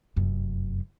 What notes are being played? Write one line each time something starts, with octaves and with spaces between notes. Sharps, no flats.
F1 F#2